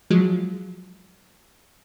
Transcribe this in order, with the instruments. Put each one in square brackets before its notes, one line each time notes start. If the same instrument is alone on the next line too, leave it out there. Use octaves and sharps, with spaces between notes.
[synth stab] F3 F#3 G#3